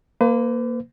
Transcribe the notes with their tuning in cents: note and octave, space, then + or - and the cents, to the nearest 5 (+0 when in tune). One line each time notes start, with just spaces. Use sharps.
A#3 +0 B4 +45